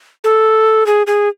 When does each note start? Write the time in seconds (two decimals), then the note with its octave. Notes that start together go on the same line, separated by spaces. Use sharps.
0.24 A4
0.86 G#4
1.07 G#4